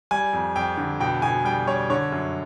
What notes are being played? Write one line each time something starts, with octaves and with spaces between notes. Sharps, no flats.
G3 G#5
F2
F2 G5
D3
B2 G5
B2 G#5
G3 G5
G3 C#5
D3 C#5
F#2